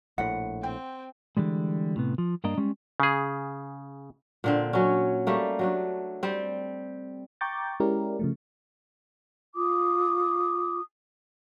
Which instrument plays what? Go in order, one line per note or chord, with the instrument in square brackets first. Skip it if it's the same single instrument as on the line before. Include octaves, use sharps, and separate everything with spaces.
[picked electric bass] A#1 A2 [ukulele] F#5
[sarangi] C4 [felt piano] G5
[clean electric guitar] D3 E3 G3 G#3
A2 C3 B3
F3
G2 A#3 D4 D#5 A#5
G3 G#3 C#4
[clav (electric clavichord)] C#3 G#4
[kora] A#2 D3 C4
F#3 C#4
G3 A3 A#3
F#3 A3 D4
G3 C4
[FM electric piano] G5 A#5 C#6 D6 G6 A6
G#3 C#4 E4 G4 A#4 D5
C#3 F3 A3
[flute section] F4 D6 D#6